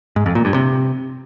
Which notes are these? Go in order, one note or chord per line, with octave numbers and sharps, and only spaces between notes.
G#2
F2
A#2
G2
C3